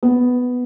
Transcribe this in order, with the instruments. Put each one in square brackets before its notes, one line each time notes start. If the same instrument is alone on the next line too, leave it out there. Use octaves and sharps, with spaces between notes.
[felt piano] B3